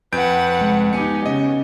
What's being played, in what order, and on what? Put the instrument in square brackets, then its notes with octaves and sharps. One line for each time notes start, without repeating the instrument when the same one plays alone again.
[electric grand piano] F2 G6 D7 [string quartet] B4 F#5
[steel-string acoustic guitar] C3 G#3 C4
[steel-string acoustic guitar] B3 G#5 [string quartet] D#4 G4 [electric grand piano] C#7
[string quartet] C#3 [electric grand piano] D#5